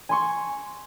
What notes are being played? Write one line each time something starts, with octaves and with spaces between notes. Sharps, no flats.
G#5 C6 C#6